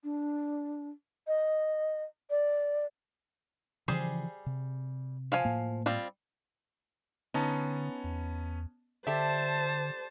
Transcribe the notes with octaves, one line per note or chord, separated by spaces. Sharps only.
D4
D#5
D5
C#3 E3 F3 G3 G#4 C5
C3
F3 F5 G#5
A2 A#3
G3 C4 F4
D3 B3 C#4 D#4 A5
E2
D3 G4 A4 C5 D5 E5 A5